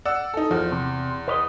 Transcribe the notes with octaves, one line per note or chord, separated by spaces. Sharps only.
D5 F#5 E6
D#4 A4
E2 F3
C3
B4 C#5 D#5